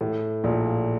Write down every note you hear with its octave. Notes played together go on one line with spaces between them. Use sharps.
A2
A#1 A#2